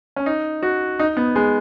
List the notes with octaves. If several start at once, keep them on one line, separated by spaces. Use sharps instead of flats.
C#4
D#4
F#4
D#4
B3
G#3